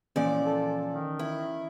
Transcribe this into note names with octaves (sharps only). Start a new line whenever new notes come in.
A#2 E3 F3 C#4 D5
A4
D#3
E4